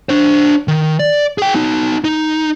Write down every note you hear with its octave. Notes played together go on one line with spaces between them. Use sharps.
D4 C5
D#3
D5
G#4 G5
B3 D#4
D#4